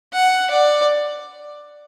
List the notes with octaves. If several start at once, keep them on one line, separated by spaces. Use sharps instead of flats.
F#5
D5